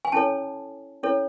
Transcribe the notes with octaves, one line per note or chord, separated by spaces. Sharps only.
G#5
C#4 E4 A4 C#5 A5
C#4 E4 A4 C#5